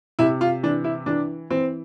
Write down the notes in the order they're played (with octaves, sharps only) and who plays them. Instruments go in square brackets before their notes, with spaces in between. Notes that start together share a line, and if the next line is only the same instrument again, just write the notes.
[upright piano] C3 E4
F4
E3 D4
E4
E3 D4
E3 C4